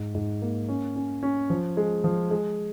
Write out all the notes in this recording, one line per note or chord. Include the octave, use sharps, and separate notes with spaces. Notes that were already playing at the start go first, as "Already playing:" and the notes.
Already playing: G#2
G#2
A#3
C#4
C#4
C#4
F3
G#3
F3
G#3